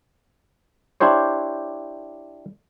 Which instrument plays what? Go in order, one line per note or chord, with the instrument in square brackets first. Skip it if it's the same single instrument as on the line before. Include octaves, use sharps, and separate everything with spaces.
[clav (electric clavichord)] D4 E4 G4 C5 C#5